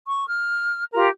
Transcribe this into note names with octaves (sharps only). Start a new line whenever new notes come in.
C#6
F6
F4 G4 A#4